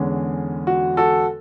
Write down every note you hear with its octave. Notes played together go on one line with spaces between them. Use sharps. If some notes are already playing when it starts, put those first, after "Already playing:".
Already playing: E2 D3 G#3 C#4
F#4
F#4 A4